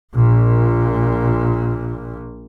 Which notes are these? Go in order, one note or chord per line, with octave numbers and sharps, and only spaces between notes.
A#1 A#2